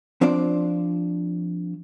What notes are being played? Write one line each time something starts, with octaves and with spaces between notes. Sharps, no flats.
F3 C4 D4 F4 C5 D5